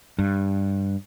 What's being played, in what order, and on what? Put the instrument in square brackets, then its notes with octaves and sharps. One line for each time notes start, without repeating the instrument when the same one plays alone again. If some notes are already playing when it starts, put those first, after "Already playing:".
[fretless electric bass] G2